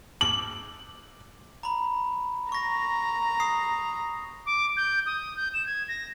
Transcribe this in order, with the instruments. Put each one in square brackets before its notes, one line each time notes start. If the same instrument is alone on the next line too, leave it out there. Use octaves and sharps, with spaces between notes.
[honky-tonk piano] F#7
[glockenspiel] A#5 B5
[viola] A#5 [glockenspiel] C#6 A#6
[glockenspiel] D#6 C7
[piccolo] D6
G6
D#6
G6
E7
G#6
A#6